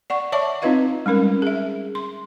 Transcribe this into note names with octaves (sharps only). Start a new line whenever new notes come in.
D5 F#5 C#6
C#5 D5 E5 A5 C#6 D6
C4 D#4 F4 B4 D#5 F5
G3 G#3 C#4 A#4
G#4 E5
C6